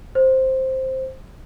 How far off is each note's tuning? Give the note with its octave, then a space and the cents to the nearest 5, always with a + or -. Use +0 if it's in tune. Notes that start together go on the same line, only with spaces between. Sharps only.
C5 +5